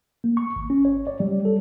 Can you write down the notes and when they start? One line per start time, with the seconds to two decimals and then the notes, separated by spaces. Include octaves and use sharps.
0.24 A#3
0.37 C#6
0.56 G#1
0.70 C#4
0.85 C#5
1.07 D5
1.20 G3
1.45 A4